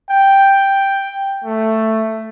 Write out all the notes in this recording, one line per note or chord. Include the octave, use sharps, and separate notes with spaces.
G5
A3